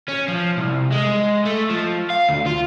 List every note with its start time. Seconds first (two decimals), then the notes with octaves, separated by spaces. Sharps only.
0.08 C#4
0.28 F3
0.58 C2
0.92 G#3
1.45 A3
1.70 F3
2.10 F5
2.29 D2
2.46 F4